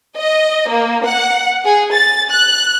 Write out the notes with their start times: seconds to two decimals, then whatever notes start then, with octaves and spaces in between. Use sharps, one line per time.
0.16 D#5
0.69 A#3
1.05 F#5
1.65 G#4
1.93 A6
2.30 F#6